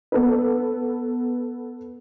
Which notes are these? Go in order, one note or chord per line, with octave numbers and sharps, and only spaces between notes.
B3 A4 B4